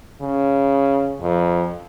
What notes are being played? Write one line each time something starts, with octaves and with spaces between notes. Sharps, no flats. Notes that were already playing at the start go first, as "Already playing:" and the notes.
C#3
F2